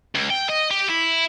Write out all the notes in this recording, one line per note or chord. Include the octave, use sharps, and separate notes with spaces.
C#2
G5
D#5
G4
E4